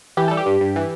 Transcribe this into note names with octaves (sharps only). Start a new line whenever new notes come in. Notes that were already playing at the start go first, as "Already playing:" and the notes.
E3 G4
G3 A4
G4
G2
G2
E3